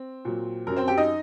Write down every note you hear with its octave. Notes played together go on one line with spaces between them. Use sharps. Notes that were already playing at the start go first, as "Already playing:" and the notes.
Already playing: C4
A#2 F#3
F#2 F#3 A#4
C4 C5
G4 G5
D#4 D#5